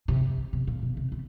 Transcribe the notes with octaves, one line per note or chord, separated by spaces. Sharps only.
C3
C3
A#2
B2
C3
C3